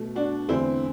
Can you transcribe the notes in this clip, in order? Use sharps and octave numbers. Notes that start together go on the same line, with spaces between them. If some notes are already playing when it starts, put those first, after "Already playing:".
Already playing: B2 A3
D4 F#4
E2 D3 A3 C4 E4